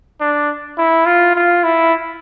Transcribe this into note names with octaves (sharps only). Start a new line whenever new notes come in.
D4
E4
F4
F4
E4